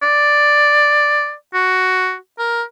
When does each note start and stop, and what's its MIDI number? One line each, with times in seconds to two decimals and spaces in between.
0.02 1.34 74
1.54 2.15 66
2.39 2.62 70